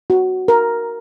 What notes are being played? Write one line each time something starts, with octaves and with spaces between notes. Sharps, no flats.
F#4
A#4